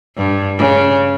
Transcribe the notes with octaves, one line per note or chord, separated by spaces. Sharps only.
G2
C#3